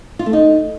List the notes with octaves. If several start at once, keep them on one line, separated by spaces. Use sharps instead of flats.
F4
A3
D#4